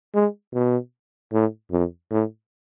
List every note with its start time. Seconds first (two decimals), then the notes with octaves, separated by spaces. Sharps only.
0.15 G#3
0.54 B2
1.33 A2
1.72 F2
2.11 A2